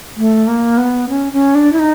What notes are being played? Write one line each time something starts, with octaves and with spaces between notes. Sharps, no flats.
A3
A#3
B3
C#4
C#4
D4
E4
D#4